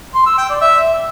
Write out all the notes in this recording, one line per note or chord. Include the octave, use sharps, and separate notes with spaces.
C6
E6
G5
D5
E5